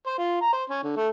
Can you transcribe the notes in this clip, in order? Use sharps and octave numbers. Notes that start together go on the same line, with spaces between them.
C5
F4
A#5
C5
C#4
D3
A3